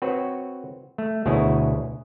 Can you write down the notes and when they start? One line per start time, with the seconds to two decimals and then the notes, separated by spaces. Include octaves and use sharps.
0.02 C4 F#4 B4 C#5
0.98 A3
1.26 D2 B2 E4 G#4 C#5 F#5